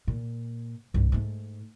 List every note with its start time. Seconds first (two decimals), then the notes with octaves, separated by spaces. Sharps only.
0.07 A#2
0.94 C2 G2
1.12 G#2 A3